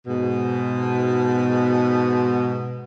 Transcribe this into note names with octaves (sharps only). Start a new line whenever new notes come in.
G#2 B2